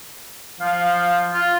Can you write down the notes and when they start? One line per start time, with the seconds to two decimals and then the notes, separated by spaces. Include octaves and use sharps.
0.60 F3 F5
1.33 F4